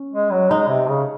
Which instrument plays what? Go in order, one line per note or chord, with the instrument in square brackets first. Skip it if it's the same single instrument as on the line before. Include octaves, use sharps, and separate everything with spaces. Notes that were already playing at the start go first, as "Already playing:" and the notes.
Already playing: [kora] C#4
[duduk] G#3
F#3
[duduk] G#3 [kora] D#4
[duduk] C3
C#3